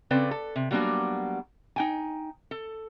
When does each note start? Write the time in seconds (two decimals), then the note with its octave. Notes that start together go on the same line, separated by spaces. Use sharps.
0.11 C#3 C4 A4 B4 D5
0.31 A4
0.56 C3
0.71 F#3 G3 A#3 B3 D4 F#4
1.76 D#4 G5 G#5
2.51 A4